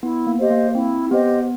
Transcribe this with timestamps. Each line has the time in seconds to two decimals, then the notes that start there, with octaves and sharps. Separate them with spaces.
0.02 B3 E4
0.27 A#3
0.39 G4 C5 D#5
0.50 A#3
0.75 C4 E4
1.11 B3 G4 C5 D#5